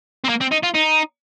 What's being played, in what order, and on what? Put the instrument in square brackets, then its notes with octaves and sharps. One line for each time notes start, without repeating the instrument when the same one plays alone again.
[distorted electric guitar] C4
A#3
C4
D#4
F4
D#4